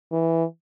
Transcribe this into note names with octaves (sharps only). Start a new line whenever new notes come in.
E3